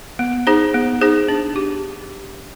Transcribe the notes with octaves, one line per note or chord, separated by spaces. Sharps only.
B3
D#4 G#4 C5
B3
D#4 G#4 C5
D4
G4